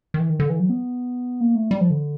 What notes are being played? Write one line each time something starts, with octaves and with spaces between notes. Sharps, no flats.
D#3
E3
D#3
D3
E3
F#3
B3
A#3
A3
G3
F3
D3